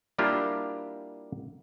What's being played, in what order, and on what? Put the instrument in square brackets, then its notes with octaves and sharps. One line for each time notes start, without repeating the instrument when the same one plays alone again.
[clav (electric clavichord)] G3 A#3 D4 E4 F4 G4